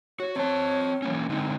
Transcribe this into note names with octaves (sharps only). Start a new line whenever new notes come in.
F#4 C#5
C4 C#5 A5
E3 A#3 C#4
D3 G#3 C4 D#4